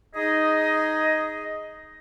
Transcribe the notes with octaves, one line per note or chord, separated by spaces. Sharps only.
D#4 G#4 D#5